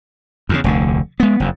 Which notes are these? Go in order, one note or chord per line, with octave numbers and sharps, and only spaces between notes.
E2 A2 C#3
F1 D2 D3
G#3 B3
F#1 F2